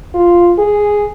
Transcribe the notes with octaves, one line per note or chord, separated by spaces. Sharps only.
F4
G#4